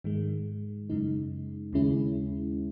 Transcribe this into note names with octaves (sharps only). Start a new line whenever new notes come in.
G#2 D#3 G#3
F#2 C#3 G#3 D#4
D#2 C#3 G#3 C#4 E4